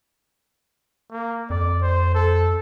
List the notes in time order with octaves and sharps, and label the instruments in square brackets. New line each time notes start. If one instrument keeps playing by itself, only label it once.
[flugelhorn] A#3
[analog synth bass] F2 [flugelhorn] D5
[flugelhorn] C5
A4